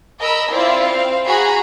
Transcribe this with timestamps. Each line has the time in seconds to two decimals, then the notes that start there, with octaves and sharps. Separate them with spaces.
0.20 A#4 D#5 B5 E6
0.51 C4 E4 F4 D5
0.85 C4 F5
1.26 F#4 G#4 A#5 B5